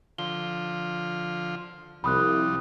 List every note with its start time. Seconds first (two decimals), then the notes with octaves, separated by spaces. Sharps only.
0.18 D3 F3 F4 G7
2.04 C2 F3 G3 B5 D#6 F#6